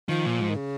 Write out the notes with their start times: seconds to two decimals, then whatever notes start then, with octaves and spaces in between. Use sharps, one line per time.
0.09 D#3 F3
0.25 A#2
0.40 G#2
0.50 D#3
0.56 C#3